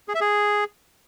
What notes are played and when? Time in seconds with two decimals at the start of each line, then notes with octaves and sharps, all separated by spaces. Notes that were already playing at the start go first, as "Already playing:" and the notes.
0.08 G#4
0.15 E5
0.21 G#4